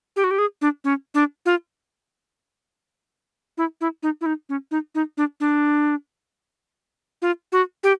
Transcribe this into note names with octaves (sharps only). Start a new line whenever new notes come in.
G4
F#4
G4
G#4
D4
C#4
D4
F4
E4
E4
D#4
E4
D#4
C#4
D#4
D#4
D4
D4
F4
F#4
G4